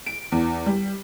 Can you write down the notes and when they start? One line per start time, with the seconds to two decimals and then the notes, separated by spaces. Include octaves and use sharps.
0.06 D7
0.32 E2
0.66 G3